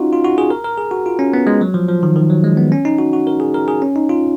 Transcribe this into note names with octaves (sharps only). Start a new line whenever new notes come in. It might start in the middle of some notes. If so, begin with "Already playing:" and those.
Already playing: C#4 D#4 F4 F#4
F4
F#4
G#4
A#4
A#4
G#4
F#4
F4
C#4
B3
G#3
F#3
F3
F3
D#3
D#3
F#3
G#3
B3
C#4
D#4
F#4
F#4
A#4
G#4
A#4
G#4
C#4
D#4
F4